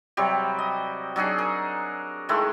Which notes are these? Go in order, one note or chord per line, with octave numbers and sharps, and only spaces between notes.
C3 F#3 G3 G4
D#5
F#3 D4 D#4 G#4
A#4
D#3 G#3 A3 E4